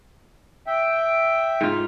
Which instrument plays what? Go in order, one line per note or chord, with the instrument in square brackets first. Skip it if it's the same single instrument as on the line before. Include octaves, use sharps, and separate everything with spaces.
[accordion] E5 G5
[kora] G#2 F4